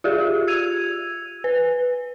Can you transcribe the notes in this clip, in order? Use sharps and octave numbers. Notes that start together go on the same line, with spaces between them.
F4 G4 G#4
E6 G#6 D#7 F7
B4